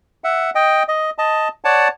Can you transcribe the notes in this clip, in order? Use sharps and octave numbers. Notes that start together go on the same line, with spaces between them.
E5 F#5
D#5 G5
D#5
D#5 A5
C#5 D5 F#5 A5